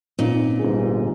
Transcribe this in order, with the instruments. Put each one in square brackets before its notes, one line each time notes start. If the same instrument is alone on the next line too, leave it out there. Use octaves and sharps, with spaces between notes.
[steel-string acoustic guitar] A#2 [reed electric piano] C4 C#4 D#4
[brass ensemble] G1 G#2 [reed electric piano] G#4